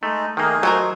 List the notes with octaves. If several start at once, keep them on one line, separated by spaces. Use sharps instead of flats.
G#3 A3 D#4
D#3 A3 A#3 D#4 G#4
F#3 A#4 C5 D#5